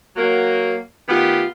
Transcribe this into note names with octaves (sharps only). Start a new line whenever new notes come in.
F#3 A#3
D#3 A3 B3 F4 G4